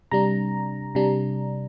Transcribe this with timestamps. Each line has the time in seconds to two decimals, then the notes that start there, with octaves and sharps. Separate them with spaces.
0.12 C3 G3 D4 A#5
0.95 C3 G3 D4